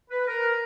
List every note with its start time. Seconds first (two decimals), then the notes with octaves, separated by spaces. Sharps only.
0.11 B4
0.28 A#4